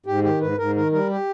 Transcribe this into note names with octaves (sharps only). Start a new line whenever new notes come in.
G#2 G4
D#3 G4
G#2 B4
G#2 A#4
D#3 A#4
G3 A#4
G4